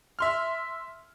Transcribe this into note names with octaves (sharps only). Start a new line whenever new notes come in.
E5 C6 F6